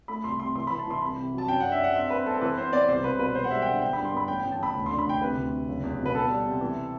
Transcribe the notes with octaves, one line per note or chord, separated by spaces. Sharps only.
A3 B5
C2 C6
C3 C6
E3 C6
E3 B5
A5
E3 C6
C2 B5
C3
F#3
A5
F#2 G5
D4 F#5
E5
D4 F#5
C4 E5
C4 B4
C4 A4
A4
E3 B4
B3 C5
B3 D5
C2 C5
C2 B4
B2 B4
E1 C5
F#5
G3 E5
G5
D3 F#5
D3 G5
G2 B5
C6
B3 B5
A1 G5
A1 G5
A5
A1 B5
D2
D3 C6
B5
D2 G5
C3 B4
D2
C3
F#1
E2
B2
B4
B3 A4
G3
C3
E3